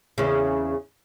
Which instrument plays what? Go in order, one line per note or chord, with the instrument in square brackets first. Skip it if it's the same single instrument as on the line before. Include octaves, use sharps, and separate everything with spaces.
[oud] E2 C#3